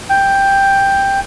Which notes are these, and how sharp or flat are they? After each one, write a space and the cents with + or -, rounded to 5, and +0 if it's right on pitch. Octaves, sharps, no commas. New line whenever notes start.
G5 +5